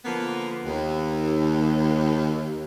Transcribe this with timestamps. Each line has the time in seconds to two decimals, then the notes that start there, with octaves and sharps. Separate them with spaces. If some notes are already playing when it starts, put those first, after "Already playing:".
0.04 D3 F3 A#3 B3
0.65 D#2